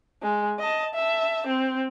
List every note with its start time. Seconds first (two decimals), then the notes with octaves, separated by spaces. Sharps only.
0.23 G#3
0.60 D#5 A5
0.95 E5 A5
1.47 C4